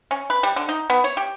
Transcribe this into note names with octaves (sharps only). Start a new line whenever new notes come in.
C#4
B4
G3
D3
D#4
B3
C#5
G4